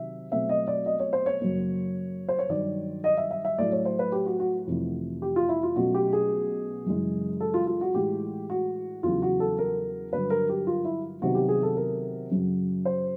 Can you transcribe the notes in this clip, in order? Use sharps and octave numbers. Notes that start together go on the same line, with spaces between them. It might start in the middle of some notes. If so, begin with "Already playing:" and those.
Already playing: C3 D#3 F#3 E5
B2 F#3 A3 C4 E5
D#5
D5
D#5
C#5
C5
C#5
F#2 C#3 F#3 A#3
C5
C#5
G2 D#3 F#3 D5
D#5
E5
E5
E5
A2 F#3 A3 D5
C#5
C5
B4
G4
F#4
F#4
F2 C3 E3 A3
G4
F4
E4
F4
B2 F#3 A3 C#4 F#4
G4
G#4
F#2 C#3 E3 G#3
A4
F4
F4
F#4
A2 E3 G#3 G4
F#4
E2 C#3 F#3 B3 F4
F#4
A4
A#4
G2 D3 F#3 B4
A#4
G4
F4
E4
C3 D#3 F#3 B3 F#4
G4
G#4
A4
A#4
F#2 C#3 F#3
C5